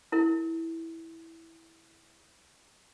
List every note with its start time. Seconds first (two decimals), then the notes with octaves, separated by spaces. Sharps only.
0.12 E4 A#4